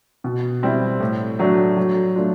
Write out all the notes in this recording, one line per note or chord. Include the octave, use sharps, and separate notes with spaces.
B2
G3 C4 E4
A2
F#3 A3 D4
F#3
A3 D4 F4